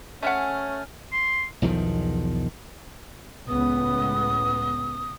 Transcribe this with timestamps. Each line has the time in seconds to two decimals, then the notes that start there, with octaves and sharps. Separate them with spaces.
0.23 A3 C#4 E5 F#5 G#5 F6
1.12 C6
1.62 B1 E2 D#3 F3
3.48 C#2 A2 B3 D#6